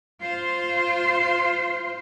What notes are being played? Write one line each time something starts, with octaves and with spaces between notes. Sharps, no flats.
F4 C5